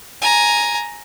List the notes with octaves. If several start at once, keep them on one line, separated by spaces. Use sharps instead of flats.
G#5 A#5